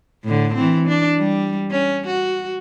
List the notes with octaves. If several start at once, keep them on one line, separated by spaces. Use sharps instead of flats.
A2 D3
E3 C4
D4
G3
C#4
F#4